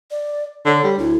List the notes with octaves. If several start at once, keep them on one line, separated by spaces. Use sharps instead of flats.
D5
D3 C#5
G3
D2 E4